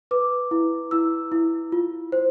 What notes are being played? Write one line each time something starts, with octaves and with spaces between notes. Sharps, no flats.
B4 D6
E4
E4 E6
E4
F4
C5